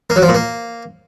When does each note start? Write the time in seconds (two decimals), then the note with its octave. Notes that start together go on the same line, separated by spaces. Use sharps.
0.10 A#3
0.16 F#3
0.22 F3
0.28 A#2
0.35 A#3